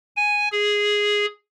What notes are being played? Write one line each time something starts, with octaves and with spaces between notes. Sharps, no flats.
G#5
G#4